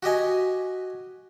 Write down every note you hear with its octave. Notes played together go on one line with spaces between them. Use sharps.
F#4 G4 D#5 G#5